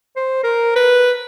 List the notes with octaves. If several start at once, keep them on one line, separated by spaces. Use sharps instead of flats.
C5
A#4
B4